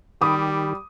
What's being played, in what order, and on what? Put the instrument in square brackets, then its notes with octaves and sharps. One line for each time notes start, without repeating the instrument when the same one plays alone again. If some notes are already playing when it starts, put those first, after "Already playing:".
[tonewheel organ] D#3 G4 [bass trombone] G3 [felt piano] B5 D#6 [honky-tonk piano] D6